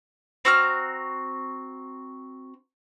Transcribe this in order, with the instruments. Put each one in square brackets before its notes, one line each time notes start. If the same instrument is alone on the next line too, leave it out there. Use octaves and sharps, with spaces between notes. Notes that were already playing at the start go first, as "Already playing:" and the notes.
[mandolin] C4 F#4 A#5 F6